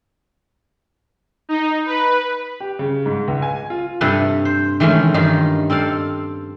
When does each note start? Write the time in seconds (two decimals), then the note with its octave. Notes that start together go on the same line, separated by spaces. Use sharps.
1.49 D#4
1.86 B4
2.60 G4
2.79 C#3
3.06 G#2
3.28 C#2
3.42 G#5
3.70 F4
4.01 G2 C3 A4 B4
4.45 C5
4.80 D#3 E3 G#3 A3 C#4
5.14 G2 D#3 D#4 F4
5.70 C4 A4 D5 F5